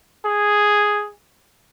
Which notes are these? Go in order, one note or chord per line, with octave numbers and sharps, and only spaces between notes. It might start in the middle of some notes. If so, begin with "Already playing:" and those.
G#4